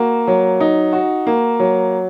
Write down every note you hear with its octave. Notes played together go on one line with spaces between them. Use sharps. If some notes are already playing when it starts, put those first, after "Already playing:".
Already playing: A#3 F#4
F#3
D#4
F#4
A#3
F#3